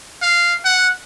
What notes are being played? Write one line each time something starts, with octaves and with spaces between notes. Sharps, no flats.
F5
F#5